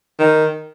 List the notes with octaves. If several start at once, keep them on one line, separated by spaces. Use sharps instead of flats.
D#3